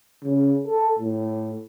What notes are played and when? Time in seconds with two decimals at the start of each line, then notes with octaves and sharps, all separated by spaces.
0.25 C#3
0.67 A4
0.99 A2